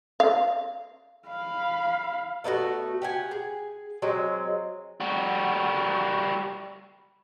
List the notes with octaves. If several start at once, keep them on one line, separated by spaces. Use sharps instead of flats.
F5
F5 B5
A3 B3 D#4 F#4
G4 F#5 G#5
G#4
F#3 G#3 C4
G3 F#4